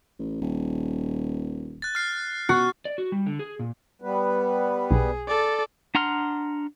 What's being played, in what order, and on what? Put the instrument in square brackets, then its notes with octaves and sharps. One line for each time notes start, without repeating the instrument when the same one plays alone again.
[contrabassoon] A1
D#1
[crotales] F#6 A6
F6 C7
[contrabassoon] B2 [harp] F#4 [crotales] F#6
[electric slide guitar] D5
F#4
G3
D3
G#4
A#2
[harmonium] G3 B3 B4
[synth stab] B1 [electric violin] G#4
[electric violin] A4 D5
[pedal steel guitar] D4 F#5 A#5 C6 F6